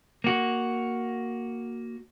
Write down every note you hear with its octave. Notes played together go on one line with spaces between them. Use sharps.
A#3 F#4